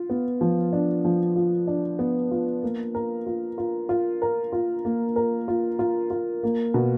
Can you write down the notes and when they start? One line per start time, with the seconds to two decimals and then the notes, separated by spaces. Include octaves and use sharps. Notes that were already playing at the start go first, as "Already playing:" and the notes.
Already playing: F4
0.10 B3
0.41 F3
0.73 D4
1.05 F3
1.36 F4
1.67 D4
1.99 B3
2.31 F4
2.63 A#3
2.95 A#4
3.27 F4
3.58 F4
3.89 F4
4.22 A#4
4.53 F4
4.85 A#3
5.16 A#4
5.48 F4
5.79 F4
6.10 F4
6.43 A#3
6.74 B2